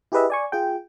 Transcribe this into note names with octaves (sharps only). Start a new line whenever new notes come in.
E4 G4 G#4 B4 D#5 E5
D5 G#5 C#6
F4 G#4 G5